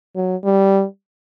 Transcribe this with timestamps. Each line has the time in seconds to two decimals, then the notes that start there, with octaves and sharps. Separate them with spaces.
0.16 F#3
0.44 G3